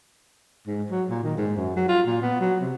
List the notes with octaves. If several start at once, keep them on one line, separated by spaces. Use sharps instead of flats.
G#2
F#3
A#2
D#3
G#2
F#2
F#3
F4
A#2
B3
F#3
C3